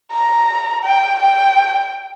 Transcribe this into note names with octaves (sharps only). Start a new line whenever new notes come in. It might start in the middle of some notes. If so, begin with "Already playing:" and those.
A#5
G5
G5